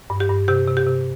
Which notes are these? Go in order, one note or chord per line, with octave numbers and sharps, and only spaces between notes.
G2
G4
G2
C3 G4
C3
G4
C3